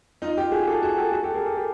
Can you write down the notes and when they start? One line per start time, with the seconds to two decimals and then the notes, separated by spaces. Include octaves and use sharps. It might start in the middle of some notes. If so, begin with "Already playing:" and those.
0.22 D#4 F4
0.37 F4 G4
0.52 F#4 G#4
0.67 G4 A4
0.82 F#4 G#4
0.97 G4 A4
1.12 F#4 G#4
1.23 G4 A4
1.34 G#4 A#4
1.46 G4 A4
1.57 G4 A4